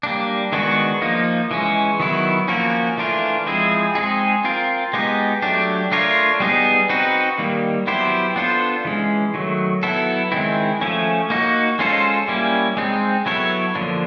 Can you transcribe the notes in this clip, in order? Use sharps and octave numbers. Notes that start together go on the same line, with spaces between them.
G3 A#3 D4
D#3 G#3 B3 D4 F#4
F3 A#3 D#4
E3 G#3 C#4
D#3 F#3 B3 E4
F3 A#3 C#4 F#4 A#4
E3 A3 D4 F4 A#4
F3 G#3 C4 E4 G#4
G#3 C4 D#4 G#4
C4 F4 A#4
G#3 B3 D#4 G4
F#3 A3 D4 G4
A3 D4 F4 A#4 C#5
G3 B3 D#4 G#4
C4 D#4 F#4 B4
D#3 G3 A#3
F#3 B3 E4 G4 C5
B3 D4 F4 A4 C5
E3 G#3 C#4
D#3 F#3 A3
F#3 B3 E4 A4
D#3 G#3 C4 E4
F3 A3 C#4
A#3 D#4 F#4
G#3 C#4 F4 A4 C5
G3 A#3 C#4 E4
G#3 C4 D#4
F#3 B3 E4 A4 C#5
D3 F3 A#3 D4